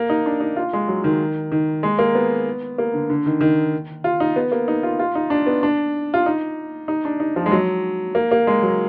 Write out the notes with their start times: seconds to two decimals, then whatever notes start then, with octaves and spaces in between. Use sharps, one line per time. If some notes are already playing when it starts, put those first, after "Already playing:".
Already playing: A#3
0.10 D#4
0.26 D4
0.41 D#4
0.56 F4
0.73 G#3
0.88 F#3
1.04 D#3
1.52 D#3
1.83 G#3
1.99 A#3
2.15 B3
2.78 A#3
2.94 D3
3.10 D3
3.26 D#3
3.41 D#3
4.04 F4
4.20 D#4
4.36 B3
4.52 A#3
4.68 D#4
4.83 F4
4.99 F4
5.15 D#4
5.30 D4
5.46 B3
5.63 D4
6.14 F4
6.26 D#4
6.88 D#4
7.05 D4
7.20 D#4
7.36 F3
7.46 G#3
7.51 F#3
8.15 A#3
8.31 A#3
8.47 G#3
8.62 F#3